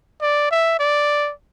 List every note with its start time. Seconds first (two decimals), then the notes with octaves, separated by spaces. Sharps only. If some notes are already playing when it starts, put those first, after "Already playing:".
0.21 D5
0.51 E5
0.79 D5